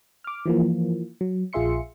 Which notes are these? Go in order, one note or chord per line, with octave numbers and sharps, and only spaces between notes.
D6 F6
E3 F3 A#3
F#3
A#1 F4 G#4 E5 C6 C#7